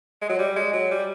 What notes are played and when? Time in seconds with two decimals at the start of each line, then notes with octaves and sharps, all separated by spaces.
0.21 G#3
0.29 F#3
0.39 G3
0.56 G#3
0.73 F#3
0.91 G3